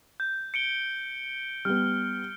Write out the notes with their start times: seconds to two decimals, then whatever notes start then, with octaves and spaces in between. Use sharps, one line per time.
0.20 G6
0.54 C#7 D7 G7
1.65 G3 B3 F6